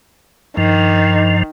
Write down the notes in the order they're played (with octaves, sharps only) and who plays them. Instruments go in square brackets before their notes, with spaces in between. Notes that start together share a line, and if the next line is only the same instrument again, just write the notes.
[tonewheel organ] G2 F3 [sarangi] D#3